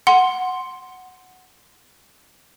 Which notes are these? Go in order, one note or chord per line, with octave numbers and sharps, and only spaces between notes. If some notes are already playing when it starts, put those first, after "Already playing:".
F#5 C6